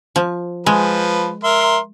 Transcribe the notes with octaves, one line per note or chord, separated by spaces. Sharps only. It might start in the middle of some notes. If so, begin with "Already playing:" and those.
F3
F3 G#3 B4
A#4 E5 C6